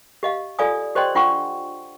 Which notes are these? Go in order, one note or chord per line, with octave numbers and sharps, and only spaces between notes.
G4 D#5 F5
F4 A4 D5 F5 G#5 D#6
G4 C5 D5 D#5 G5 C6
D4 F4 F#5 G5 C#6